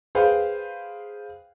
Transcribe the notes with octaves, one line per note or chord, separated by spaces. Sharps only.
G#4 B4 C5 F5 G5